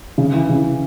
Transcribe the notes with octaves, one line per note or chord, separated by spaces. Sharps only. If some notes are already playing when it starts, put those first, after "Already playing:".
C#3
E3
C#3